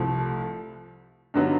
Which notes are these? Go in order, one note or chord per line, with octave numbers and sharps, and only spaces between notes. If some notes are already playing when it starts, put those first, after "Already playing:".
Already playing: C2 C3 F3 A3
G2 D3 F#3 B3 D#4